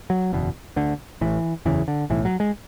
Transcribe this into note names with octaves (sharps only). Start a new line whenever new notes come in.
F#3
F#1 E2 B2
D2 D3
A1 A2 E3
F#1 E2 C#3 E3
D3
B1 A2 E3
F#3
G#3